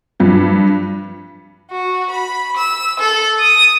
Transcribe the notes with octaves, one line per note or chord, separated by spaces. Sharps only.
G2 F3
F#4
B5
E6
A4
D#6